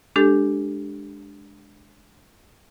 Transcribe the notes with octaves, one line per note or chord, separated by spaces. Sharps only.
G#3 D4 G4 A4